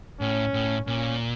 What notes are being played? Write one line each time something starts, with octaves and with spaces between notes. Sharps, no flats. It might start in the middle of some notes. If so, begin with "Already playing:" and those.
A2 C#4
A2
A#2 C#4